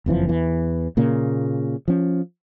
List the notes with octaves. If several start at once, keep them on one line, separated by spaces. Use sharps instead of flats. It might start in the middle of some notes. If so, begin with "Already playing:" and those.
F#1 F2 E3 F3
E2 E3
A#2 C#3 A#3
F3 C#4